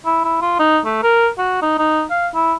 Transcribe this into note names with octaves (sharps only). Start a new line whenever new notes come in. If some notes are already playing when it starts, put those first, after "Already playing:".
E4
E4
F4
D#4
A3
A#4
F#4
D#4
D#4
F5
E4